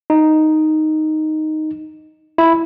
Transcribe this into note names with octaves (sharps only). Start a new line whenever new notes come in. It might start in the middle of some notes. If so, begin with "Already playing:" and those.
D#4
E4